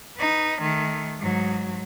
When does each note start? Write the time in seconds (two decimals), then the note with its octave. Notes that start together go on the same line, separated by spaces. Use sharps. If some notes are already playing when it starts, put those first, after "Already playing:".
0.18 D#4 B4
0.62 D#3 A3
1.19 G#2 F#3